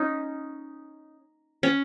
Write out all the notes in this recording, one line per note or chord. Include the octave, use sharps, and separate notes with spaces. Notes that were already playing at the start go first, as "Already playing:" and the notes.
Already playing: C#4 D#4
C#4